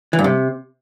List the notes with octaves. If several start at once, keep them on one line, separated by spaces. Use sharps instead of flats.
E3
G2
C3